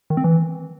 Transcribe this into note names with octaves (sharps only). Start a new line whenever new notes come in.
D#3
C4
E3